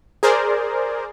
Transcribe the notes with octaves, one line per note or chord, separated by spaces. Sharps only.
G#4 A#4 C5 D5